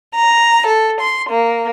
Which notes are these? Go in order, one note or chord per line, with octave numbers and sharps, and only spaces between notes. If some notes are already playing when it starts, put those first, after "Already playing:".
A#5
A4
C6
A#3